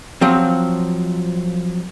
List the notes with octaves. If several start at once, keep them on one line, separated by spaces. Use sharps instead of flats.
F3 F#3 C4